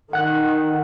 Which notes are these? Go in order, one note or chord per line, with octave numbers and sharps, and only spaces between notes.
D#3 F#5 F#6